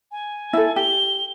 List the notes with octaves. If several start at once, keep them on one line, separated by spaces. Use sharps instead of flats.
G#5
E4 A4
G4 G7